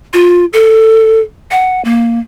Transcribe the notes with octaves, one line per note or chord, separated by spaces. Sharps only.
F4
A4
F#5
A#3